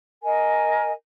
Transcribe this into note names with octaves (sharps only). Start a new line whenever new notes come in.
A#4 D#5 G#5